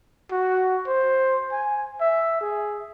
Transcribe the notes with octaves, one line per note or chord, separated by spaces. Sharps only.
F#4
C5
G#5
E5
G#4